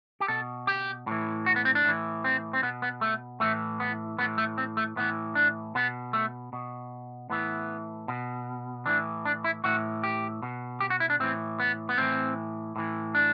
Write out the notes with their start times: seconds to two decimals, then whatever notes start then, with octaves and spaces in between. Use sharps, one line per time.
0.20 G4
0.28 B2 A4
0.67 G4
1.07 A2 E3
1.46 F#4
1.56 B3
1.65 C4
1.75 D4
1.85 A2 E3
2.24 C4
2.53 C4
2.63 B2 B3
2.82 B3
3.01 A3
3.40 A2 E3 A3
3.80 B3
4.19 A2 E3 B3
4.38 A3
4.58 C4
4.77 A3
4.96 A2 E3 B3
5.35 D4
5.75 B2 B3
6.13 A3
6.53 B2
7.30 A2 E3 B3
8.08 B2
8.86 A2 E3 D4
9.25 D4
9.44 E4
9.64 A2 E3 F#4
10.04 G4
10.42 B2
10.80 G4
10.90 F#4
11.00 E4
11.10 D4
11.20 A2 E3 C4
11.60 B3
11.89 B3
11.98 A2 E3 C4
12.76 A2 E3
13.15 D4